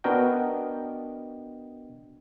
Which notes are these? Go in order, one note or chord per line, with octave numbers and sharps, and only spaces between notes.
B3 D4 F#4 A#4 D#5 G5